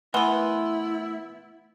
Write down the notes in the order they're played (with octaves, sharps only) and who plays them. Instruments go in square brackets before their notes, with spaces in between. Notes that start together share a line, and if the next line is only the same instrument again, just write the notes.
[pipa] E3 B3 [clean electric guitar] A3 A#4 C6 [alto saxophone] E4 [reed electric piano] F#5